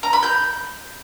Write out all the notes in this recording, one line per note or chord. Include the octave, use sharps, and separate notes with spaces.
A#5
B5
G6